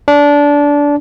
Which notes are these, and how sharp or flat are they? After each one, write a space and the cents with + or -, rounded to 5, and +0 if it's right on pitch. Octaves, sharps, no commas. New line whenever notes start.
D4 -20